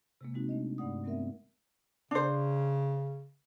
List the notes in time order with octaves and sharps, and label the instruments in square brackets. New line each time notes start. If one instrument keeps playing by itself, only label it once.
[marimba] C3 G#3 A#3
G#3 C4 D#4 F#4
A3 D4 D#5
G2 A3 D5 F#5 D#6
F#3 A3 B3 C4 A#4 E5
[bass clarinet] C#3 [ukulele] D4 C5